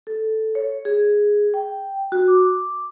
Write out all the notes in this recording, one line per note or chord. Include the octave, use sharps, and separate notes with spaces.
A4
C#5
G#4
G5
F#4
D6